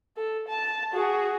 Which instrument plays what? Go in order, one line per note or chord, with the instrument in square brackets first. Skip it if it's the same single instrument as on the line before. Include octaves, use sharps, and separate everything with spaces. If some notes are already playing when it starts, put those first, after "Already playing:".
[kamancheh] A4
A5
F#4 G#4